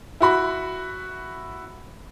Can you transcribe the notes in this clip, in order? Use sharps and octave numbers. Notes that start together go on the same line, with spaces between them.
E4 F#4 B5